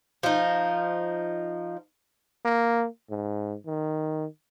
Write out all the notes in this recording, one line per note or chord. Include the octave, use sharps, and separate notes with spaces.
F3 D#4
A#3
G#2
D#3